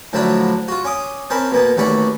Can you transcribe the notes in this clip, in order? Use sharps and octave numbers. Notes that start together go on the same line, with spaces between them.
A2 D3 F3 F#3 D4 E4
F4 F#4
C#4 D6 D#6
C4 C#4 A#4 A5 B5
B2 A#3 B3
A1 D#2 C#4 F#4 D5 B5